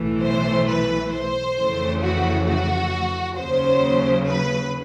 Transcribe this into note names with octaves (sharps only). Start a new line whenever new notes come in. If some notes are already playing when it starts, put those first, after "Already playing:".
Already playing: B1 A2 E3 A3
C5
B4
C5
F2 C#3 E3 A3
F#4
F#4
D#2 C#3 F#3 C5
B4